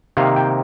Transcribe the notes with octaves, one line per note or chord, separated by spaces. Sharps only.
C3 D#3 A#3 F5
G5